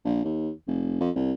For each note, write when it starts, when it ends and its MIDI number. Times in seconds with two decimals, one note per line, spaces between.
0.05 0.22 34
0.25 0.51 39
0.68 0.96 29
1.00 1.10 41
1.16 1.33 36